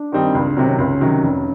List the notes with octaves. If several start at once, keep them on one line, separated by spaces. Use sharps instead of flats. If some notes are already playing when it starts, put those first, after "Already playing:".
Already playing: D4
D#3 G3 C4 D#4
C#2 D4
C3 D#3 F#3 C4
C#4
C#2 C#4
C3 D#3 F#3
F1